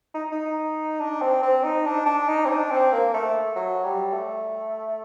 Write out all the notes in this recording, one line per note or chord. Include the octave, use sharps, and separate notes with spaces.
D#4
D#4
D4
C4
C4
D#4
D4
D4
D#4
C4
D4
C4
A#3
A3
F#3
G3
A3